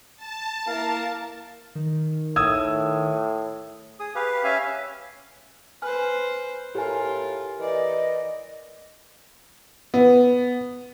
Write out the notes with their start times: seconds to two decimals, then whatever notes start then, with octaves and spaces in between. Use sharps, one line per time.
0.17 A5
0.67 A#3 E4 A#4 F5
1.75 D#3
2.36 A2 D#6 E6 G#6
4.00 G#4 D#6
4.15 G4 B4 F5
4.44 C#4 E5 F5 G#5
5.82 B4 C5 G#5 F6
6.75 A2 F4 G4 A#4 G#5
7.59 E3 A#4 D5 D#5
9.94 B3